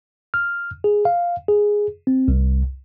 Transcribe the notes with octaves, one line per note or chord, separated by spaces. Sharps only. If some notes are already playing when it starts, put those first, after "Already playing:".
F6
G#4
F5
G#4
C4
C2